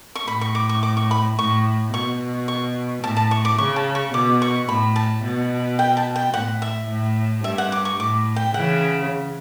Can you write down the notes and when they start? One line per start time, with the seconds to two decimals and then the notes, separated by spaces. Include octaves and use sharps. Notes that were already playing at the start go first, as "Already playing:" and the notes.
0.15 C#6
0.28 A2 B5
0.41 C#6
0.55 D6
0.69 C#6
0.83 D6
0.97 C#6
1.11 B5
1.38 A2 C#6
1.93 B2 C#6
2.48 C#6
3.03 A2 A5
3.17 A5
3.31 C#6
3.45 D6
3.58 C#3 C#6
3.76 A5
3.95 C#6
4.14 B2 D6
4.42 C#6
4.69 A2 B5
4.96 A5
5.24 B2
5.79 G5
5.97 A5
6.16 G5
6.34 A2 F#5
6.62 E5
6.89 A2
7.44 G2 E5
7.58 F#5
7.72 D6
7.85 C#6
8.00 A2 D6
8.36 G5
8.54 C#3 E3 F#5